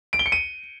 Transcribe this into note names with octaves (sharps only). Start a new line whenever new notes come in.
D7
G7
C#7
D#7